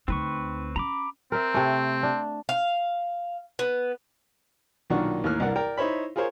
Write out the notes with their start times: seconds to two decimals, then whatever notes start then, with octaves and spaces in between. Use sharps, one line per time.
0.08 D2 C4 D#4 B4 C#6
0.76 C#4 A#5 B5 D6
1.32 C4 A#4 E5
1.54 C3 A3
2.03 D4
2.49 F5
3.59 B3
4.90 B1 A#2 D#3 D4 F#5 C#6
5.24 D#2 A2 A#3 A#4 F6 F#6
5.40 C2 G2 A#4 D5 F#5
5.56 A#4 D5 G5 A#5
5.77 D#4 E4 C5 C#5 B5
6.16 F4 G#4 A#4 C5 C#5